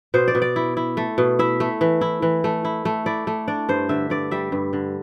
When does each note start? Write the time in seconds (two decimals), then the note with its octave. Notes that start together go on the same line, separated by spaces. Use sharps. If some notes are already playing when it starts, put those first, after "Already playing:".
0.14 B2 C5
0.28 D5
0.35 B2
0.42 D5
0.56 E4
0.77 E4
0.97 A3
1.18 B2
1.39 E4 E5
1.60 A3
1.81 E3
2.01 E4
2.22 E3
2.44 A3
2.65 E4
2.85 A3
3.06 E4 D5
3.27 A3
3.48 D4 D5
3.69 G2 C5
3.89 D3 E5
4.10 G2 D5
4.31 G3 E5
4.52 G2
4.73 D3